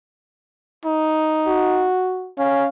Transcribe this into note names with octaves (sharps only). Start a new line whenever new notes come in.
D#4
F#4
C#4 F5